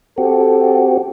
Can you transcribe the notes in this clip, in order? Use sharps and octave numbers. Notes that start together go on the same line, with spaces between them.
C4 F#4 G4 A4